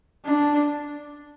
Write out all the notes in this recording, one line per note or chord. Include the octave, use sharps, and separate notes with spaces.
D4